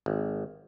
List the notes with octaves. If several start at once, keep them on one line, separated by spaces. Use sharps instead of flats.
G#1